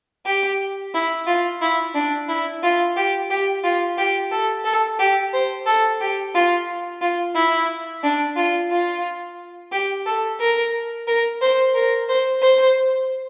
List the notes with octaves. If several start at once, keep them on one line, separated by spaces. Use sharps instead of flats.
G4
E4
F4
E4
D4
E4
F4
G4
G4
F4
G4
A4
A4
G4
C5
A4
G4
F4
F4
E4
D4
F4
F4
G4
A4
A#4
A#4
C5
A#4
C5
C5